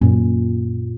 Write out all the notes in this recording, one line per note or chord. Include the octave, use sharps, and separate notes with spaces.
F#2 A#2 C#4